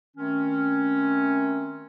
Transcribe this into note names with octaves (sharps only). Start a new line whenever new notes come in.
D#3 A3 C4 C#4